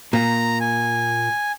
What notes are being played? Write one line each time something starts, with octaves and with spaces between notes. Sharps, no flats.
A#2 A#5
G#5